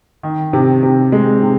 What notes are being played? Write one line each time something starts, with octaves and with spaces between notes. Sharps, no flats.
D#3
C3
C3
G#3
C3